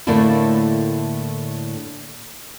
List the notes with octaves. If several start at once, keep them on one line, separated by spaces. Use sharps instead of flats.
A2 D3 A3 A#3 D4 E4